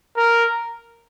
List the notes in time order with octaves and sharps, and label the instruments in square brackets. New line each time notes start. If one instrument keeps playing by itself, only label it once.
[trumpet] A#4